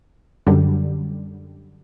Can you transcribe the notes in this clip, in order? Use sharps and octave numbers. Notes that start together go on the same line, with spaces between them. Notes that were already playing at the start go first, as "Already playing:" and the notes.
F#2 D3 G3